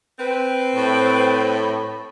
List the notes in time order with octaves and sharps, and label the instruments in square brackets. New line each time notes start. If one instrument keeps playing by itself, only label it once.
[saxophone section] C4 B4
[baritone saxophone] A2